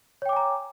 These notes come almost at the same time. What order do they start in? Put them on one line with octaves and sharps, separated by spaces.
C#5 G5 D6 G#5 A#5